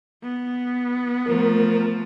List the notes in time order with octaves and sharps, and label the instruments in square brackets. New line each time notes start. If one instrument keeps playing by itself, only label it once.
[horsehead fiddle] B3
[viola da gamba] F3 A3 [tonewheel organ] A#4